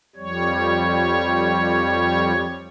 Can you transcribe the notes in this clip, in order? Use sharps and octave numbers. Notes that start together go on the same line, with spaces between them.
F2 G3 C#5